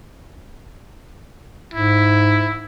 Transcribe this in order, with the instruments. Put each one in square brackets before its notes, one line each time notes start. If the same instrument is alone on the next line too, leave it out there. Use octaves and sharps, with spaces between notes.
[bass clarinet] G#2 [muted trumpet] E4